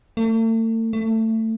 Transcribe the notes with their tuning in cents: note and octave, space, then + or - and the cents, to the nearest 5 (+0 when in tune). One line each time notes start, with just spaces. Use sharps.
A3 +40
A3 +20